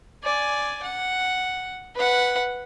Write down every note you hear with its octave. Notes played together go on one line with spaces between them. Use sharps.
D5 G#5
F#5
B4 F#5